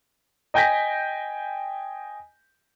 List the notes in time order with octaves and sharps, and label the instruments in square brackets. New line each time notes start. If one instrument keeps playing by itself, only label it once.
[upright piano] D#5 G5 G#5 G6 A#6 B6